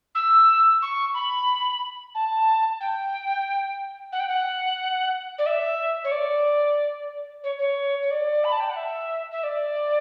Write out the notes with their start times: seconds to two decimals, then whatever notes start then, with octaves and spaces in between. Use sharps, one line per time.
0.15 E6
0.82 C#6
1.14 B5
2.14 A5
2.80 G5
4.12 F#5
4.20 G5
4.28 F#5
5.38 D5
5.46 E5
6.04 C#5
6.11 D5
7.43 C#5
7.59 C#5
8.02 C#5
8.11 D5
8.44 B5
8.52 A5
8.60 G5
8.69 F#5
8.76 E5
9.31 E5
9.43 D5